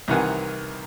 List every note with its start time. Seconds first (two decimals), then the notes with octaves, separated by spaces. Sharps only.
0.08 C2 C3 D#3 E3 F#5 G#5